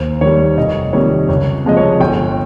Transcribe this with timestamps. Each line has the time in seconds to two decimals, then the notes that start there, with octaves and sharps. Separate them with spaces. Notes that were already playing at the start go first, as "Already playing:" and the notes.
Already playing: D#2 C5
0.21 D#3 G3 C#5
0.57 F1 D#5
0.93 F2 D#3 G3 C#5
1.29 C#2 C#5
1.64 C3 F3 G#3 D#5
1.77 C#5
2.00 G1 G5